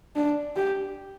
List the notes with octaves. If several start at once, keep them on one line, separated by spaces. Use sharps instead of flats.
D4
G4